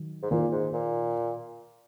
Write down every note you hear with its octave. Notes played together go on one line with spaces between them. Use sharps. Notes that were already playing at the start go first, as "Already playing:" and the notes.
Already playing: D#3 F#3
G#2
A#2 D#3 A#3 F4 A#4
G#2
A#2